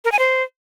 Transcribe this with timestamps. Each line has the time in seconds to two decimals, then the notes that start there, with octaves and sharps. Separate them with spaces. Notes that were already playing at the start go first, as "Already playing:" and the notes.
0.05 A#4
0.12 G#5
0.19 C5